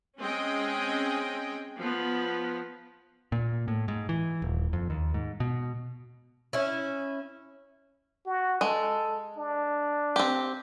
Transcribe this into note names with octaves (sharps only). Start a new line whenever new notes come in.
G#3 C4 C#4 D#5 G5 G#5
F3 B3
A#2
A2
G#2
E3
D#1
F2
D#2
G#2
B2
C#4 E4
F#4
G#3 A4
D4
C4 G4